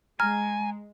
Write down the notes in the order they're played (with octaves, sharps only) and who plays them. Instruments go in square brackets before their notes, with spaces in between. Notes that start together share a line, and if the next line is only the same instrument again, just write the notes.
[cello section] G#3 [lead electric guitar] G#5 [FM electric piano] A#5 [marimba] F6